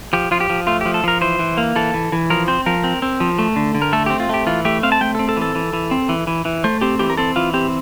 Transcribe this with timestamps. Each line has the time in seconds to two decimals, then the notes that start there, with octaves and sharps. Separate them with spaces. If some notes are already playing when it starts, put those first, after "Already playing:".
0.13 F3 G4
0.31 F3 F4
0.40 G4
0.50 F3
0.67 A3 F4
0.81 G4
0.86 F3
0.94 A4
1.04 F3 A#4
1.21 E3 C5
1.39 E3
1.58 A#3
1.76 E3 A4
1.94 E3
2.12 E3
2.30 F3 A#4
2.48 C4 C5
2.66 F3 A#4
2.84 C4
3.02 C4
3.20 F3
3.39 A3
3.56 D3
3.75 D3
3.82 A#4
3.93 A3 A4
4.06 C4 G4
4.20 F4
4.29 A3 G4
4.47 E3 F4
4.65 A3 G4
4.83 C4 F5
4.92 A5
5.01 A3 G5
5.15 A4
5.19 C4
5.29 A4
5.37 E3
5.42 A4
5.55 E3
5.73 E3
5.91 C4
6.09 E3
6.27 E3
6.45 E3
6.64 A3 C5
6.81 C4 G4
6.99 E3 G4
7.10 A#4
7.17 C4 A4
7.36 E3 F4
7.54 C4 G4